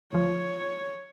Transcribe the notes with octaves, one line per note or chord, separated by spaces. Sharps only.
D2 F3 C#5